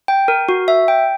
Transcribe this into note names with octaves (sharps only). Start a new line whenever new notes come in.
G5
A#4
F#4
E5
G5